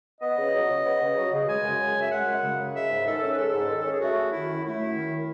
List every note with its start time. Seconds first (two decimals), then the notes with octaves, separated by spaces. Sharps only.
0.21 B3 D#5
0.38 C#3
0.53 F#3
0.69 C#3
0.85 B3
1.01 C#3
1.16 F#3
1.33 C#3
1.47 G#3 G#5
1.64 F#2
1.80 C#3
1.95 F#2
2.00 E5
2.11 G#3 F#5
2.27 F#2
2.42 C#3
2.58 F#2
2.74 G#3 E5
2.90 G#2
3.06 D#3 A4
3.21 C#4
3.32 B4
3.37 G#3 A4
3.53 G#2
3.69 D#3
3.80 C#4 A4
3.90 G#4
4.01 A3 F#4
4.16 F#2
4.32 D#3 E4
4.48 F#2
4.64 A3 E4
4.80 F#2
4.95 D#3